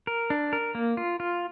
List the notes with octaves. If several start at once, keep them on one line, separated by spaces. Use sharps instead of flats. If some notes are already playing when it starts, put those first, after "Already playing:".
A#4
D4
A#4
A#3
F4
F4